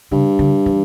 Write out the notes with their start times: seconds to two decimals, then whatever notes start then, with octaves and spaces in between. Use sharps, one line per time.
0.11 G2 C#3
0.39 D3
0.66 E3